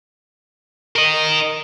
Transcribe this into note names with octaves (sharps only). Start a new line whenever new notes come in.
A#4 D#5